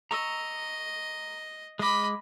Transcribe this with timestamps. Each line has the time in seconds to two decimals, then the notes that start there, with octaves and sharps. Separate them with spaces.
0.11 D#5 A#5 C#6 E6
1.79 G#3 D#5 B5 D6